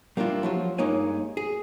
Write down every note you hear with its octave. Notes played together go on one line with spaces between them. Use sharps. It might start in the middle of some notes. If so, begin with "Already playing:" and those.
G3 A#3 D4 E4 F4
F3 F#3 F4
G2 G#3 A#3 D#4 C#5 G#5
G#4